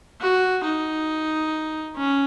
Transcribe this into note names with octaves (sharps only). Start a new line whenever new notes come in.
F#4
D#4
C#4